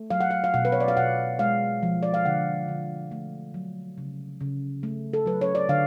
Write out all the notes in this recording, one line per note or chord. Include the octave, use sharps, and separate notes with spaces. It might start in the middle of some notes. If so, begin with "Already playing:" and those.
Already playing: A3
F#3 F5
F#5
F5
F5
B2 F#5
B4
C#5
D5
F5
B2 F#5
G#3 F5
F3
D5
F5
D3 F#5
D3
A3
F#3
C#3
C#3
A3
A4
F#3 B4
C#5
D5
D3 F5